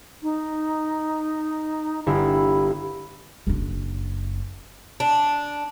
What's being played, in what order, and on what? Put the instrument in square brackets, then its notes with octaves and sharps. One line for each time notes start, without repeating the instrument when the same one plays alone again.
[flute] D#4
[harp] G1 E4 E6 [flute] B5
[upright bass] F#1 D4
[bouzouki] D4